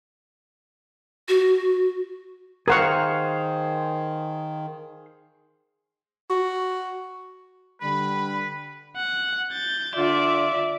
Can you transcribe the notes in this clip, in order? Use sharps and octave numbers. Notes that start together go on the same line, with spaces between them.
F#4
D#3 G#4 A#4 C5 F5 F#5 C#6
F#4
D3 G3 B4 B5
F#5
G6 A6
D3 F4 D5 E5